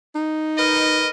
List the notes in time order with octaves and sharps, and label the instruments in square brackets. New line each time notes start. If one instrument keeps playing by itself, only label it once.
[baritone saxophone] D#4
[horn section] A#4 B4 D#5